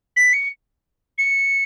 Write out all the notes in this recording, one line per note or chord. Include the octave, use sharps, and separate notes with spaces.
B6
C#7
C#7